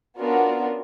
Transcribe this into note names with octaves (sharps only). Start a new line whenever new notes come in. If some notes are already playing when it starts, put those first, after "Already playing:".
B3 C#4 D4 F4 F#4 A#4